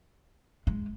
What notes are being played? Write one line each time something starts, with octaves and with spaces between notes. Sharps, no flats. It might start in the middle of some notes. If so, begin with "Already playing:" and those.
G#3